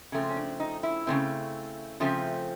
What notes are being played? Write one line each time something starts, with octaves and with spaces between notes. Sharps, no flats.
C#3 F3 A3 C4
C#4
D4
D#4
E4
C#3 F3 A3 C4
C#3 F3 A3 C4